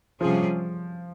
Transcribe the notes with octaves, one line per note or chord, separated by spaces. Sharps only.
C3 F3 G3 C#4 F4 G#4